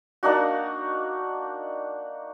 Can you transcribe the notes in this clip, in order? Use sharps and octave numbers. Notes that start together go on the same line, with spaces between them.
A#3 D4 D#4 F#4